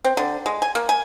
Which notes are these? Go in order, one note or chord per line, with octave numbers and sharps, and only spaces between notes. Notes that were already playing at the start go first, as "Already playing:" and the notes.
C4
D3
G#3
G#5
A#3
G#5